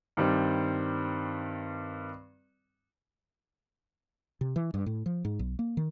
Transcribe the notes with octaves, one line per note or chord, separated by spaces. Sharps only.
G2 D#3 G3 C4
C3
E3
G2
A2
F3
G#2
B1
A#3
D#3